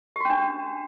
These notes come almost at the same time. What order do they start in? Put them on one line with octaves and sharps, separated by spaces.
G4 F#4 C#4 D4